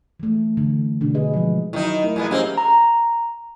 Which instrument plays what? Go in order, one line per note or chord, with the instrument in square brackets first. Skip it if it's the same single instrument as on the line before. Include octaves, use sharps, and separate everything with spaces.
[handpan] E3 A3
D3 E3
B2 D3 D4
G#4 B4 D#5
F3 G#3
[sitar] D#3 D#4 [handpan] F#3 E4
[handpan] A3 E4 A#4
[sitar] A#2 G#3 B3 [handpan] E4
[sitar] A#3 C4 [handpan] C#4 G4 G#4
[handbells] A#5